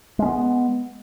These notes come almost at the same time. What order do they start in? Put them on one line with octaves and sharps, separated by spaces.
G#3 C#4 B3